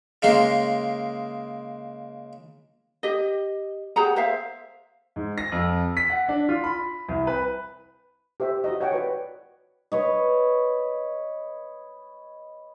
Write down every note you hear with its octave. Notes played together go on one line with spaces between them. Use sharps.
C#3 G#3 A#3 C6
G4 D#5
G4 G#4 F#5 A#5
C5 E5 F5
G#2
A#6
F2
B6
F#5
D4
F4
B5
C2
B4
G4 C5 E5
F#4 D#5
C#5 D#5 F#5 G5
F#4 B4 D5
B4 C#5 D#5